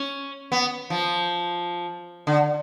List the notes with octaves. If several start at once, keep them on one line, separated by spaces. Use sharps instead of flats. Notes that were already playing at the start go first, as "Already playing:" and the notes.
Already playing: C#4
B3
F3
D3